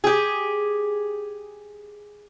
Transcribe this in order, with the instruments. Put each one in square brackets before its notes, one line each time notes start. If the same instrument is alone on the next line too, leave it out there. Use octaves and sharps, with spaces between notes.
[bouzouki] G4 G#4